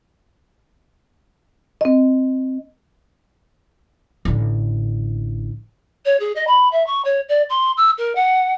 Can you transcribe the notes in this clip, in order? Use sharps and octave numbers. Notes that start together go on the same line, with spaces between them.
C4 D#5
A1 D3
C#5
G#4
D#5
B5
E5
C#6
C#5
D5
C6
E6
A#4
F#5